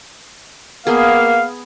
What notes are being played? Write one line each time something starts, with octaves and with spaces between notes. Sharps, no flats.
A#3 B3 G#4 F5